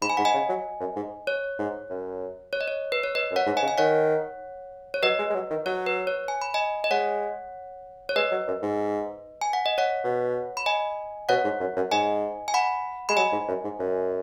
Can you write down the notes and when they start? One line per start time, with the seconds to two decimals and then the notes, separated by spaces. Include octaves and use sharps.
0.02 G#2 B5
0.10 G#5
0.17 G#2 F#5
0.25 D#5 G#5
0.34 C#3
0.49 F#3
0.80 F#2
0.96 G#2
1.27 C#5
1.59 G#2
1.90 F#2
2.53 C#5
2.61 D#5
2.68 C#5
2.92 B4
3.03 C#5
3.15 B4 D#5
3.31 F#2
3.36 C#5 F#5
3.46 G#2
3.57 D#5 G#5
3.62 C#3
3.68 G#5
3.78 D#3 C#5 F#5
4.94 C#5
5.03 F#3 B4 D#5
5.19 G#3
5.30 G#3
5.34 F#3
5.50 D#3
5.66 F#3 C#5
5.86 B4
6.07 C#5
6.28 G#5
6.42 B5
6.54 D#5 G#5
6.84 D#5
6.90 G#3 C#5 F#5
8.09 C#5
8.16 G#3 B4 D#5
8.31 F#3
8.48 F#2
8.62 G#2
9.41 G#5
9.53 F#5
9.66 D#5
9.78 C#5 F#5
10.04 B2
10.57 B5
10.66 D#5 G#5
11.29 B2 C#5 F#5
11.44 G#2
11.60 F#2
11.76 F#2
11.91 G#2 D#5 G#5
12.48 G#5
12.54 F#5 B5
13.09 G#3 B5
13.17 F#3 D#5 G#5
13.32 G#2
13.48 F#2
13.64 G#2
13.79 F#2